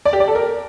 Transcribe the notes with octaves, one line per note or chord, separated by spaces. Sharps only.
D5
G4
D5
A4
A#4